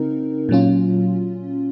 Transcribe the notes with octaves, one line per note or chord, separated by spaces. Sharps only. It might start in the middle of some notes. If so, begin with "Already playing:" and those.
Already playing: C#3 C4 D#4 A#4
A#2 F#3 C#4 F4